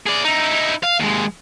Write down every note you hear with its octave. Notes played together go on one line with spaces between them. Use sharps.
G#4 D5
D#4 E4
F5
D#2 G#3